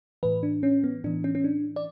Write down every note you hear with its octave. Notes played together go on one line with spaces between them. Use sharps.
A2 E3 B4
D4
C#4
B3
A2 E3 D4
C#4
C#4
D4
D5